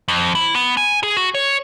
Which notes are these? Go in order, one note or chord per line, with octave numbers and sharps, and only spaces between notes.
F2
E4
B3
G#5
G#4
F#4
C#5